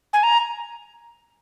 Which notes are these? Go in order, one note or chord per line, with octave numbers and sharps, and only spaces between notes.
G#5
A#5